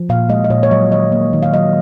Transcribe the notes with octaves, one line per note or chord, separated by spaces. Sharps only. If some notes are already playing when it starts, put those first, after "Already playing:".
Already playing: F3
A#2 F5
G#3 D#5
D#5
A#2 C#5
C#5
F#3 D#5
D#3 D#5
A#3
D#3
F5
F#3 D#5